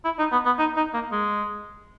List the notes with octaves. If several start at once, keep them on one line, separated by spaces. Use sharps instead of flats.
E4
D#4
B3
B3
D#4
D#4
A#3
G#3